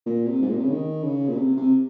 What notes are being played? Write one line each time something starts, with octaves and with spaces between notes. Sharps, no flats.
A#2
C3
G#2
A#2
C3
C#3
D#3
C#3
A#2
C3
C3